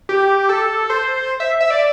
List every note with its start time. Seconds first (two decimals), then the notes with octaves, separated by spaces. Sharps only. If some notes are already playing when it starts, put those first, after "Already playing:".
0.09 G4
0.49 A4
0.90 C5
1.40 E5
1.60 E5
1.71 D5